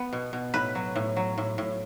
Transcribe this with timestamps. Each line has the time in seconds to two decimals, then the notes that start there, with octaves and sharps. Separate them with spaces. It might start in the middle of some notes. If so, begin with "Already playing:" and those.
Already playing: B3
0.13 B2
0.33 B2
0.54 A2 B4
0.75 F#3
0.96 A2
1.17 F#3
1.38 A2
1.58 A2